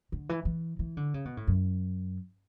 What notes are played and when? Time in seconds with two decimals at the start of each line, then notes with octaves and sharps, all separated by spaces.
0.12 D3
0.29 E3
0.45 E3
0.79 E3
0.97 D3
1.14 C#3
1.25 B2
1.37 A2
1.47 F#2